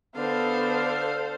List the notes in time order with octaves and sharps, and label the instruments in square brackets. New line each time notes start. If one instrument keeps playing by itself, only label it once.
[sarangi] D3 [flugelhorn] B3 [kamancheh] A4 C5 [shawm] F5